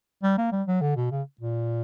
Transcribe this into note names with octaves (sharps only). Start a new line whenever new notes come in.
G3
A#3
G3
F#3
D3
B2
C#3
A#2